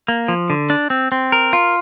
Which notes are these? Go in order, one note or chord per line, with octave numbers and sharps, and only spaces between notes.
A#3
F3
D3
D4
C4
C4
A#4
F4